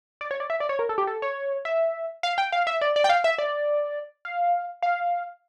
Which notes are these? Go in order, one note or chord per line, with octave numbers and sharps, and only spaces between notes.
D5
C#5
D5
E5
D5
C#5
A#4
A4
G4
A4
C#5
E5
F5
G5
F5
E5
D5
D5
G5
F5
E5
D5
F5
F5